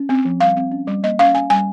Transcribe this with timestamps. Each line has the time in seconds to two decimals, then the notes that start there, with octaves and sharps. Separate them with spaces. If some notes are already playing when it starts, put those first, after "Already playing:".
Already playing: C#4
0.09 C4
0.25 F3
0.40 G3 F5
0.57 C4
0.72 C#4
0.87 G3
1.03 A#3 D#5
1.19 C#4 F5
1.34 C#4 G#5
1.50 G3 G#5